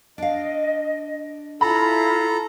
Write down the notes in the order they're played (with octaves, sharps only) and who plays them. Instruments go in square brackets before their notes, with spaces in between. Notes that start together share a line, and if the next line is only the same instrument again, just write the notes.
[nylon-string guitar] D4 F5 [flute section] D#5
[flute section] E4 F4 [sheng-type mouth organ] A4 A#5 [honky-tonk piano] B5